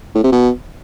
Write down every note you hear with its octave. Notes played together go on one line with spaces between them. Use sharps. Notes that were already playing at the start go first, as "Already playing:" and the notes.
A2
C3
B2